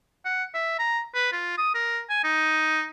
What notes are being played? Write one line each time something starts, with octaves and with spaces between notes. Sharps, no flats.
F#5
E5
A#5
B4
F4
D#6
A#4
G#5
D#4